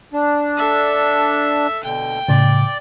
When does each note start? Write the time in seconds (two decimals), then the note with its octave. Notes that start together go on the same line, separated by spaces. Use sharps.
0.13 D4
0.57 A4 E5
1.84 B2 D3 G5
2.29 A2 C#3 D5